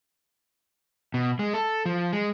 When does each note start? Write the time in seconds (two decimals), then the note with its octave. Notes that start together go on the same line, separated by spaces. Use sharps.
1.14 B2
1.39 G#3
1.54 A4
1.86 F3
2.13 G#3